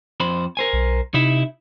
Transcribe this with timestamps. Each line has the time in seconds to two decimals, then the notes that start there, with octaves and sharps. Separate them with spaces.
0.20 F2 C5 B5
0.57 A#4 C5 G#5
0.73 B1
1.14 C3 D#4 E4 E5